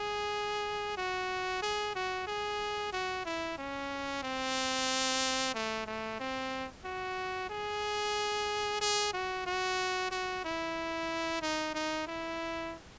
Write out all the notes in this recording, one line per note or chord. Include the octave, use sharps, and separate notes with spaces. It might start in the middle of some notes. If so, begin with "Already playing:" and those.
Already playing: G#4
F#4
G#4
F#4
G#4
F#4
E4
C#4
C4
A3
A3
C4
F#4
G#4
G#4
F#4
F#4
F#4
E4
D#4
D#4
E4